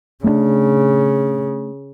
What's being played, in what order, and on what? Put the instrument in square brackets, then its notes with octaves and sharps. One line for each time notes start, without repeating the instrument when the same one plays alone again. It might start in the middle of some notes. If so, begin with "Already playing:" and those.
[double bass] C#3 [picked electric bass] A3 B3 D4